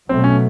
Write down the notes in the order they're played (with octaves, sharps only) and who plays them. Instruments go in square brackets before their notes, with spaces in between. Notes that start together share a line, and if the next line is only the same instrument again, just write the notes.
[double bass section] B2 F#3 A3 [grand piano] C4
[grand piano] C#4